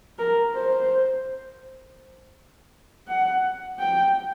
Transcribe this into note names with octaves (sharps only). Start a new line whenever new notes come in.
A#4
C5
F#5
G5